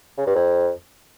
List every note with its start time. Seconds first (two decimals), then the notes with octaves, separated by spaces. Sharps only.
0.18 C#3
0.27 G2
0.36 F2